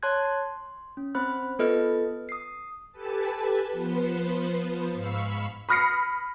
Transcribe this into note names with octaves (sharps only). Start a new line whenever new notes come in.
C#5 A5 C6 F#6 G#6
C6
C#4
C4 C5 B5 F6 F#6
B3 F4 A4 B4 D#5 F6
D#6 C7
G4 A4 B4 G#5 A5
F3 B3 B4 C5
G#2 F5 B5 C#6 E6
B5 D#6 F6 A#6 C7 C#7